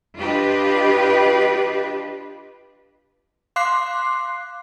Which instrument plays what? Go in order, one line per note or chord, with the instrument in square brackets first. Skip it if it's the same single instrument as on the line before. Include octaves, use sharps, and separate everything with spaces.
[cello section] D4 F4 G4 B4 D#5
[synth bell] F5 C6 D6 F#6 C7